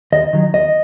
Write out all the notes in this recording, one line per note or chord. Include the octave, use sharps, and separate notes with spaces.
D#2 D#5
D#3 F#3
D#2 D#5